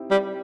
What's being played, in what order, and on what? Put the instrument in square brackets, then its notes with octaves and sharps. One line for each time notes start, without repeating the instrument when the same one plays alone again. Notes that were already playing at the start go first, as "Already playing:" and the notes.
Already playing: [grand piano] C4 D#4 E4 G4
[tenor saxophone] G3